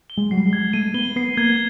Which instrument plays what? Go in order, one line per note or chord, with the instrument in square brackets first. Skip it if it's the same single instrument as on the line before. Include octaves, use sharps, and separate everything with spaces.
[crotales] G7
[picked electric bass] G#3
[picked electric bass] F#3 [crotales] C7
[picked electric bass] G3
G#3
[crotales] G#6
[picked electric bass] A3 [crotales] D#7
[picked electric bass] B3 [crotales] G7
[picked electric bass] B3 [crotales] C7
[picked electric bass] A#3 [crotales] G#6